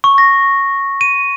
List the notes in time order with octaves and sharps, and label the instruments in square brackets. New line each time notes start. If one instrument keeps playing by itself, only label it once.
[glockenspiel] C#6
A#6
D#7